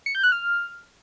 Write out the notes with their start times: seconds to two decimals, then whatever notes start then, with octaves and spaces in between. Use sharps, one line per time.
0.06 C#7
0.15 G6
0.23 F#6
0.32 F6